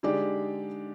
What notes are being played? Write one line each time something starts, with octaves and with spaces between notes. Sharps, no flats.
D3 G#3 D#4 G4 D5